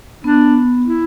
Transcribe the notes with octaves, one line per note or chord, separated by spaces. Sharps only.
B3 D4
E4